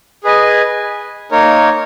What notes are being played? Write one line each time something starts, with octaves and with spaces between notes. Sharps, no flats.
G#4 B4 D#5 G#5
A#3 D#4 A#4 C#5